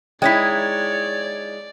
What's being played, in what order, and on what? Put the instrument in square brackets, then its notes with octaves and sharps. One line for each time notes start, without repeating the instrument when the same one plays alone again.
[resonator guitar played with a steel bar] G#3 D#4 E4 [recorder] C#5 [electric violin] D5 [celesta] G5 B6